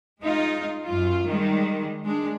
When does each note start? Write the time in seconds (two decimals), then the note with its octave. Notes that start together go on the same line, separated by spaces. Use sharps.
0.21 G#3 D#4 F4
0.85 F#2 F4
1.28 D#3 G3 G#3
2.04 G#3 D4